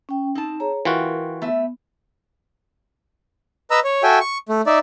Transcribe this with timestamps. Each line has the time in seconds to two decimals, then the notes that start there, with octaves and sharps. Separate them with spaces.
0.09 C#4 G5
0.35 C4 D#4 A5
0.60 G#4 C#5 A#5
0.85 E3 F4 F#4 A#4 G5
1.42 A3 B3 E5
3.71 B4 D#5 A#5 E6
3.84 C#5
4.03 F#4 A4 E5 G5 G#5
4.20 C#6
4.49 A3
4.66 D#4 D5 E5